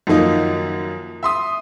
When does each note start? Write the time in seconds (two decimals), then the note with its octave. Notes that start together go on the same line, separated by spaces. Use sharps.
0.07 F#2 D#3 F3 A#3 D#4
1.23 E5 C6 D#6